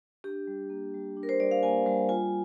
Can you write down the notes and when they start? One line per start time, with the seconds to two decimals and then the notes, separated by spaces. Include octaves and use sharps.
0.24 D4 G4
0.47 G3
0.70 A#3
0.94 G3
1.17 D4
1.23 A#4
1.29 C5
1.40 G3 D5
1.51 F5
1.63 A#3 G#5
1.86 G3
2.09 F4 G#5